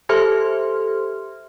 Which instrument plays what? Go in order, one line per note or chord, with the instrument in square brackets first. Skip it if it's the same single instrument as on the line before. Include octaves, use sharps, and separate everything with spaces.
[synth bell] G4 A4 C5 E5 C6 F6